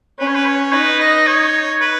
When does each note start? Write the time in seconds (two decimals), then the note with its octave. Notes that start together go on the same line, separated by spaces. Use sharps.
0.19 C#4 B4
0.27 C#5
0.35 B4
0.45 C#5
0.72 D#4 B4
1.00 D#5
1.27 C#5
1.81 B4